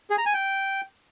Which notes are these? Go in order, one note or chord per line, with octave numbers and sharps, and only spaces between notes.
G#4
A#5
G#5
G5